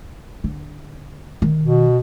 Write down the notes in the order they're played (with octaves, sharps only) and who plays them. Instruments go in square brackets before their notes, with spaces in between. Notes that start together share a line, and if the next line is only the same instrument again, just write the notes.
[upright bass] D3
D#3 D#4
[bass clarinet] B2